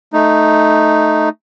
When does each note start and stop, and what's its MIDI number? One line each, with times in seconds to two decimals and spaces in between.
0.13 1.29 57
0.13 1.29 63